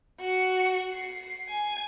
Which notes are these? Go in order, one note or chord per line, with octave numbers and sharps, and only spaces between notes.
F#4
C7
G#5